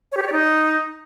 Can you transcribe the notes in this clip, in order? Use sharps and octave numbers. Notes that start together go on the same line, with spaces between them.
C#5
G4
C#5
D5
D#4